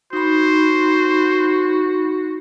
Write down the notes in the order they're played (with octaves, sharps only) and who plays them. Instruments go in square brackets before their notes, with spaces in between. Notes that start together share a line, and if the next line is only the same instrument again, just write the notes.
[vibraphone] D#4 B5 [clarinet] F#4 [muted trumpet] C5